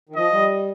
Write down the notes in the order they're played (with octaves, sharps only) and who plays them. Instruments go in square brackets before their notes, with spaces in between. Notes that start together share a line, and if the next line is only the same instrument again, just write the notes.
[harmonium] D#3
[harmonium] F3 [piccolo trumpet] D#5
[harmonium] G3